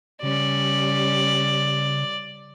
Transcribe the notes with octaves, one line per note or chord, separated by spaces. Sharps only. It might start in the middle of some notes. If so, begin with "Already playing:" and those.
C#3 G3 C#4 D5